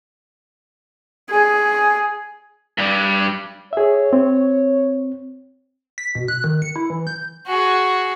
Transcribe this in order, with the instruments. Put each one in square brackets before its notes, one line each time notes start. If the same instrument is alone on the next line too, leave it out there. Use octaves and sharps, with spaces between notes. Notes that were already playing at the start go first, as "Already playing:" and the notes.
[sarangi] G#4
[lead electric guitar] G2 G3
[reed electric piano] G#4 E5 [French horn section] C#5
[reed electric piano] C4
[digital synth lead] B6
B2
F#6
D#3
C#7
E4
E3
G6
[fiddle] F#4 G#4